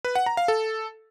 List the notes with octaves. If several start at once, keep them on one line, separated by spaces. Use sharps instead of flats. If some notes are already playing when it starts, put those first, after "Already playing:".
B4
F#5
A#5
F5
A4